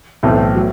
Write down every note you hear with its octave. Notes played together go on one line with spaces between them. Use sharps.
B1 A2 E3 A3 C4
F#3